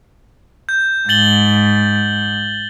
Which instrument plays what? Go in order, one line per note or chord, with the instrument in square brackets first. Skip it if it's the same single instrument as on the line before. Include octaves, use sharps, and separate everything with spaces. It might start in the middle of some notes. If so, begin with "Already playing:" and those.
[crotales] G6
[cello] G#2 [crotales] A6 F#7 G7